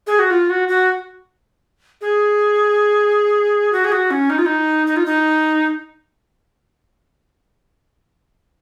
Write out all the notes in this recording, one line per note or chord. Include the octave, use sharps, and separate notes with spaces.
G#4
F#4
F4
F#4
F#4
G#4
F#4
G#4
F#4
C#4
D#4
F4
D#4
D#4
F4
D#4